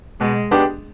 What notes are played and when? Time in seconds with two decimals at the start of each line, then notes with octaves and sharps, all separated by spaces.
0.20 B2 G#3
0.51 G#3 B3 D4 G4